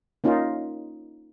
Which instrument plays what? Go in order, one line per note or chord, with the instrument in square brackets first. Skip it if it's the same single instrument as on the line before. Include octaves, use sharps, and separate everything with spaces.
[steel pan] A#3 C#4 D#4 F4